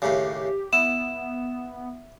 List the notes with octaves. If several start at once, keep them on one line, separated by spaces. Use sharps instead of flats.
D#2 A2 C#3 G4
B3 E4 E7